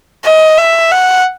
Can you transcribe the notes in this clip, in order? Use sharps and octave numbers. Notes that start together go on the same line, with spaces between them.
D#5
E5
F#5